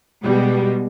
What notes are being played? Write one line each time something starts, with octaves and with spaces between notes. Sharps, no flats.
B2 G3 G#3